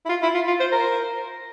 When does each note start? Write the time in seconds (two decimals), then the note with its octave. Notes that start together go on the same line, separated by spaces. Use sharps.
0.06 E4
0.09 F4
0.23 E4
0.34 F4
0.48 F4
0.60 C5
0.72 A#4